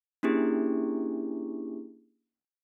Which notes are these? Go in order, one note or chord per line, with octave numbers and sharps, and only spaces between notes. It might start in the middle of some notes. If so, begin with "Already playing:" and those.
A#3 C#4 D4 E4 G4 G#4